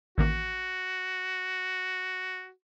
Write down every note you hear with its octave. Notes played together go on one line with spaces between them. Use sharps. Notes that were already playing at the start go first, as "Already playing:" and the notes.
A1 D#3 A#3 F#4